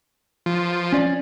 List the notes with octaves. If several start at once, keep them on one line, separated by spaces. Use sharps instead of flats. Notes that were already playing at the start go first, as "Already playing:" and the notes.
F3
C#4 D5